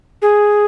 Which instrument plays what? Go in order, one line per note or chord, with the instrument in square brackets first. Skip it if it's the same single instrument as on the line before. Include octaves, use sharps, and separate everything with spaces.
[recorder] G#4